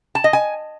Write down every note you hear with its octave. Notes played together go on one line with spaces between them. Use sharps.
A5
D#5
G#5